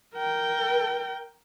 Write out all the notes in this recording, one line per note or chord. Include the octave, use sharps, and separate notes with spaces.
A#4 G5